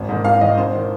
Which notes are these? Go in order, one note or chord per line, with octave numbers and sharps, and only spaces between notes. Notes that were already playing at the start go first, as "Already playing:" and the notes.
Already playing: G#1
G#2 D#3
G#1 F5
G#2 D#3 D#5
G#1 C5
D#3